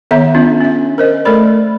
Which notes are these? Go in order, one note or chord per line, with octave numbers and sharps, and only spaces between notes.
D#3 B3 C#5 E5 A#5
B3 C#4 D4 F4
C#4 E5
A#4 C5 D#5
A3 A4 A#4 D5 B5